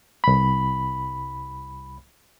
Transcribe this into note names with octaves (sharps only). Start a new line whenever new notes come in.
C2 B5